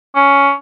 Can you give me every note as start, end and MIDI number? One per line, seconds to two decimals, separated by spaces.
0.15 0.52 61